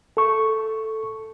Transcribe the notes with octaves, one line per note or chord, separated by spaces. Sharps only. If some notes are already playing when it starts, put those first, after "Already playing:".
A4 C#6